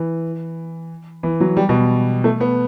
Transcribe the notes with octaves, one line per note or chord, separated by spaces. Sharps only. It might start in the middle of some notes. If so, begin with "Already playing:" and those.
Already playing: E3
E3
F#3
G3
B2
A3
B3